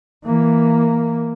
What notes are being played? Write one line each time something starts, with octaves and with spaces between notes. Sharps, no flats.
E3 A#3